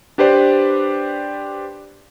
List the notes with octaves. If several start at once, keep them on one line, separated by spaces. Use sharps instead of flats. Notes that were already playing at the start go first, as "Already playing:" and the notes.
D4 G4 B4 C5 D5